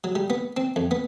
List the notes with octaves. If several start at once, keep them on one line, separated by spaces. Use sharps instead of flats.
F#3
G3
B3
C4
F2
B3